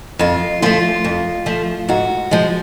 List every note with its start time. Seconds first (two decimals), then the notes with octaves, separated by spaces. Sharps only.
0.19 F2 F4
0.62 F3 A3 F4
1.04 F2
1.46 F3 A3
1.89 G#2 F#4
2.31 F3 G#3